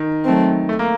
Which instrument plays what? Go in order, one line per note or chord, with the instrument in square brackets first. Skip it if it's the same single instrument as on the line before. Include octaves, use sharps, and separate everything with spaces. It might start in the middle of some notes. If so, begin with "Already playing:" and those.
Already playing: [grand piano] D#3
[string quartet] F#3 A3 C4
[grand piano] A3
A#3